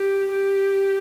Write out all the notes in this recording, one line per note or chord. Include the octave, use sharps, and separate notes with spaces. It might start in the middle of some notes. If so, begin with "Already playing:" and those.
Already playing: G4
G4